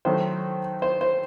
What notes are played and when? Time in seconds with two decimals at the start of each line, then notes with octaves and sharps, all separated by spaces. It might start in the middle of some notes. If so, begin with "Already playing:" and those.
0.05 D#3 F#3 A3 C5
0.82 C5
1.01 C5